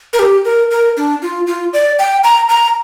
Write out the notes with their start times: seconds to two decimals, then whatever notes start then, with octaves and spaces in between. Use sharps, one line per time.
0.13 A#4
0.19 G4
0.45 A#4
0.71 A#4
0.97 D4
1.22 F4
1.47 F4
1.73 D5
1.99 G5
2.24 A#5
2.49 A#5